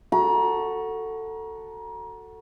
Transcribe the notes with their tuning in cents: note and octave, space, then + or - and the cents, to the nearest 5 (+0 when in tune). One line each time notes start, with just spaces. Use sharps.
F#4 +0 A4 +15 A#5 +30